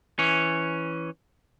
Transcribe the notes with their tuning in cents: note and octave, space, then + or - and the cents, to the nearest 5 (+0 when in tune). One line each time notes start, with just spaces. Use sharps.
E3 +0 C#4 +0